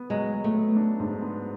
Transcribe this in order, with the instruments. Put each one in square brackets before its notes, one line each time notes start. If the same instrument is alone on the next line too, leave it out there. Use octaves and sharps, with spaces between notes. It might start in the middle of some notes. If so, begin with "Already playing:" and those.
Already playing: [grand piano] B3
[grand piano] F#3 [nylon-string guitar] G#3
[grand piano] F#3
[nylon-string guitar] A3
[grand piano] B3
D4
G#2
B3